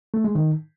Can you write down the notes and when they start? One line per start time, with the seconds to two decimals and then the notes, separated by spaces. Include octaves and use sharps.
0.14 A3
0.24 G#3
0.35 D#3